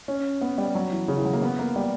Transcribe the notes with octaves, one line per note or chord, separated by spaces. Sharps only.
C#4
B3
G3
F#3
E3
C#3
E3
F#3
A#3
B3
A#3
G3